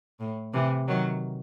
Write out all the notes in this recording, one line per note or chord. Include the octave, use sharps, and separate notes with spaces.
A2
C3 E3
D#3 F#3